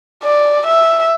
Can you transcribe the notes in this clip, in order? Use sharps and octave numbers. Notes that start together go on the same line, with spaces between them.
D5
E5